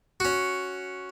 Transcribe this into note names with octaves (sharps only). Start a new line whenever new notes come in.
C#4 F#4